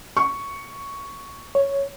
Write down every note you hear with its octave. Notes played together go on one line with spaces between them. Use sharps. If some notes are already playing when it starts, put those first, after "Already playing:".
C#6
C#5